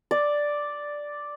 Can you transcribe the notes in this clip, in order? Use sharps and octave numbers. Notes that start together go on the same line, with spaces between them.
D5